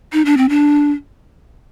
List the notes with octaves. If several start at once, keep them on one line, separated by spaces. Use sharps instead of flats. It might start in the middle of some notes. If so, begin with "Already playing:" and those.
D#4
D4
C4
D4